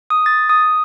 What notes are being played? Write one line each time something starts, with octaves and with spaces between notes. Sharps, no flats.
D#6
A6
D#6